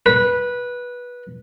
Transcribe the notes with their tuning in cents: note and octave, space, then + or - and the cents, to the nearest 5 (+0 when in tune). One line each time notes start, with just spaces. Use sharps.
B4 -15